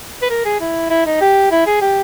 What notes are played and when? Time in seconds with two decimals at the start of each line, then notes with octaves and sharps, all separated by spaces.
0.22 B4
0.30 A#4
0.45 G#4
0.60 E4
0.90 E4
1.06 D#4
1.21 G4
1.51 E4
1.67 G#4
1.81 G4